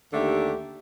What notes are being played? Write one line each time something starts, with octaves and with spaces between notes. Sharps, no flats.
D#2 D3 A3 G4 E5